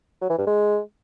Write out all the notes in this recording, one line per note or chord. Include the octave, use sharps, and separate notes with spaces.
F#3
E3
G2
G#3